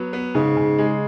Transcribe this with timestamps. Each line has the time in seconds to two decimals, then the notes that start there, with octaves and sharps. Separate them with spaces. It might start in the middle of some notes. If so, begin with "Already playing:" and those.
Already playing: F#3 B3
0.13 B3
0.35 G#2 C#3
0.57 C#3
0.78 G#3